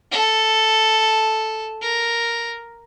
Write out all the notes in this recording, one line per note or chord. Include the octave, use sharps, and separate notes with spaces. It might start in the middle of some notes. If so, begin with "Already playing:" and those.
A4
A#4